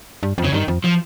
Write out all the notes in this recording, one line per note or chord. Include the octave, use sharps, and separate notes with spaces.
G2
F2
C#3
G2 D#3
F2
F3